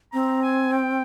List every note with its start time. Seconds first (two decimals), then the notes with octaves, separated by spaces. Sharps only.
0.13 C4 A#5
0.42 G#5
0.73 G5